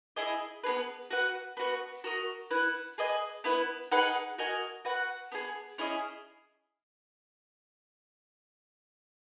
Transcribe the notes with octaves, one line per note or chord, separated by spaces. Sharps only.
E4 G#4 D#5
B3 D#4 G#4 B4
F#4 B4 F#5
B3 F#4 B4
F#4 A#4 D#5
E4 B4 F#5
G#4 B4 D#5 G#5
B3 E4 B4
D#4 G#4 B4 F#5
F#4 A#4 D#5 G#5
F#4 B4 F#5
B3 D#4 G#4
C#4 E4 G#4 D#5